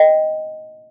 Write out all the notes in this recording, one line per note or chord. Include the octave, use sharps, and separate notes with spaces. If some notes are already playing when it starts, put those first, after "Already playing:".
Already playing: D#5 G5